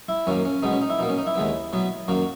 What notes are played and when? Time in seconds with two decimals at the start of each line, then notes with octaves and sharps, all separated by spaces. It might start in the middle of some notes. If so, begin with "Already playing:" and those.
0.09 E4
0.27 F#2 D#3 A#3 C#4
0.45 C#4
0.63 B2 G#3 B3 D#4
0.72 C#4
0.82 D#4
0.90 E4
0.99 B2 A#3 D#4
1.09 C#4
1.18 D#4
1.27 E4
1.35 D#2 D#3 G#3 B3
1.73 B2 F#3 B3
2.08 F#2 D#3 A#3 F#4